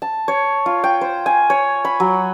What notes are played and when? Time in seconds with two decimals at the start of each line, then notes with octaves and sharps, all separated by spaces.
0.02 A5
0.28 C#5
0.66 F4
0.84 G5
1.01 C5
1.26 G#5
1.50 C#5
1.85 B5
2.00 F#3